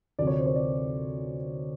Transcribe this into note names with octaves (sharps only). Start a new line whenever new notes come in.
D2 C3 F3 D5
C#5
C5
C#5
D5